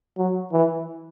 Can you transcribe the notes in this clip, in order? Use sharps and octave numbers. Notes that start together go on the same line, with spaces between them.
F#3
E3